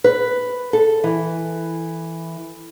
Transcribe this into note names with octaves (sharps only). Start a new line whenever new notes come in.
B4
A4
E3